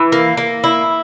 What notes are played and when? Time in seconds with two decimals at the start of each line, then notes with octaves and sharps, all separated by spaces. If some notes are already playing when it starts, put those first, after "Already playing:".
Already playing: E3
0.12 A#3
0.37 A#3
0.64 E4